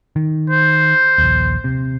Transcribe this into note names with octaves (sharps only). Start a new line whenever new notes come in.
D#3
C5
A#1 D#2
C3